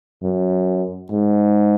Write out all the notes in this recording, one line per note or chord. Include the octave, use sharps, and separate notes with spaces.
F#2
G#2